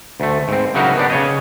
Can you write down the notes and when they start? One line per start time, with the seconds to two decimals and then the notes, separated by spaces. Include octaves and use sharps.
0.20 D2 A3
0.48 G#2 C4
0.75 C#3 F#3 D#4 E4 F#4 A#4
0.97 B3 D4 G4
1.10 C#3 C#5 D#5